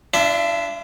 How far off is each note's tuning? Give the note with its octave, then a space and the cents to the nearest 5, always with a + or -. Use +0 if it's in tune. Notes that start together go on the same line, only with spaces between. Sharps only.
D4 +0 F4 -45 E5 +0